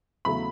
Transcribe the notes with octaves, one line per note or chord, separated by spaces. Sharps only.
E2 C#3 F#3 A3 B5